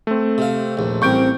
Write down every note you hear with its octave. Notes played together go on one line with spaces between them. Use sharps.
A3 C4
C3 F5
A#1 D#2
A1 G3 C4 A#4 C#6 G6 D7